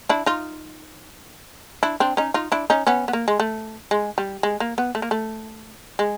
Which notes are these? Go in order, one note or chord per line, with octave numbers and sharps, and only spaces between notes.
D4 E4
D#4 F4
D4 E4
C4 D4
C#4 D#4
D#4 F4
D4 E4
C#4 D#4
B3 C#4
B3
A#3
G#3
A3
G#3
G3
G#3
A#3
B3
A3
A#3
A3
G#3